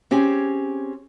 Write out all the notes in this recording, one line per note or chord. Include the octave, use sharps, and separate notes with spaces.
C4 C#4 G4 G#4 G#5